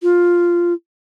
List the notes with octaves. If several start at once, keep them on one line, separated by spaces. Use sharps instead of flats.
F4